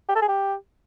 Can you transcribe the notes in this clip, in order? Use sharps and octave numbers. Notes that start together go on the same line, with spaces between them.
G4
A4
G#4
G4